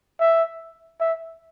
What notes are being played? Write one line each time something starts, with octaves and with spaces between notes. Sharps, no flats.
E5
E5